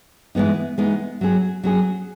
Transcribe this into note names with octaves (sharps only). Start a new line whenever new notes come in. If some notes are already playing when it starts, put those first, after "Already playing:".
E3 G#3 B3 D#4
E3 G#3 B3 D#4
F#3 C#4 G#4
F#3 C#4 G#4